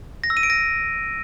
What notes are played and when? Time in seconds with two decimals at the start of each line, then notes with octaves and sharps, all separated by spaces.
0.24 A#6
0.30 E6
0.37 D#7
0.43 D7
0.50 A#6